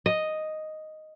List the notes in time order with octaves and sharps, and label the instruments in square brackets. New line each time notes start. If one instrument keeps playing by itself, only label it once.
[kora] D#5